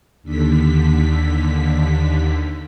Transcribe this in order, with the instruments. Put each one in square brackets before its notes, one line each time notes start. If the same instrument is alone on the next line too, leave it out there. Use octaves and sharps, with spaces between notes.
[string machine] D#2 D3 B6